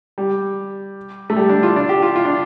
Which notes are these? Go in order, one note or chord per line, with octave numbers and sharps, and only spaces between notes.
G3
A3
G3
D4
F4
D4
G4
F4
F4
D4